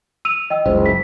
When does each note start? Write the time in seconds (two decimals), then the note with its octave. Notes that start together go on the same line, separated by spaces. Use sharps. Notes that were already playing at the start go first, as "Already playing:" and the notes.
0.25 E6 D#7 F7
0.50 D#5 G5 E6
0.66 F#1 C#2 C5
0.86 B6